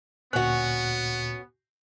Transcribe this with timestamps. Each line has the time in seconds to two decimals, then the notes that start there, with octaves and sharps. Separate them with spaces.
0.33 D2 A#2 B3 C#4 F#4 F#6